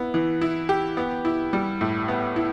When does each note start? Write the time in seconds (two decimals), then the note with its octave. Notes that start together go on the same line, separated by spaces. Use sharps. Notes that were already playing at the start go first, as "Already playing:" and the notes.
Already playing: B3 E4
0.14 E3
0.41 E4
0.69 G4
0.97 B3
1.25 E4
1.53 G3
1.81 A2
2.08 B3
2.36 E4